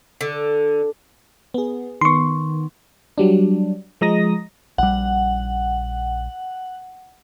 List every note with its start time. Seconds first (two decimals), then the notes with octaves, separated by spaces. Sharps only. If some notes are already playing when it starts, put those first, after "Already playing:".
0.21 D3
1.54 B3 G#4
2.01 D#3 B3 C6 C#6
3.18 F#3 G3 D4
4.01 F3 G#3 D#5 A#5 D#6 A#6
4.78 A#1 G3 F#5